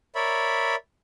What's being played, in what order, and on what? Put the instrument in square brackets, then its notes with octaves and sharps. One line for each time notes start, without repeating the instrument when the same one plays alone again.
[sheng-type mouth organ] A#4 C#5 D5 E5 B5